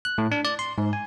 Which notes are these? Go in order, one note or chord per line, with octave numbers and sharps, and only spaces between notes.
F#6
A2
D4
D5
C6
G#2
G#5